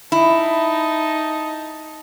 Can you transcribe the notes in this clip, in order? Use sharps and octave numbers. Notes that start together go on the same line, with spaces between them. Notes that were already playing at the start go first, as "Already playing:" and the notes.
D#4 E4 A5